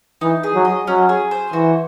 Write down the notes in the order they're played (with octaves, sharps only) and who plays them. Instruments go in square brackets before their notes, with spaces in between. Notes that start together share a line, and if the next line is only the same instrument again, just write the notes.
[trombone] E3 [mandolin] D#4
[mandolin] G#4
[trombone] F#3
[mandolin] D#5
[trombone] F#3 [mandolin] C#4
[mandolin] G#4
C5
[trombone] E3 [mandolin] F#4